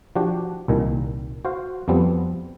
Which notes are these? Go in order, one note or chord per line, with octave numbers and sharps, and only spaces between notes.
F3 D4 F#4 G4
C2 A#2 D#3
F#4 C5 F5
F2 F3 G3 B3 C4